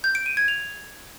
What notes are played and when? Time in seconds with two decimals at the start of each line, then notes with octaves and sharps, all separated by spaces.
0.04 G6
0.15 D7
0.26 D#7
0.37 G#6
0.48 F7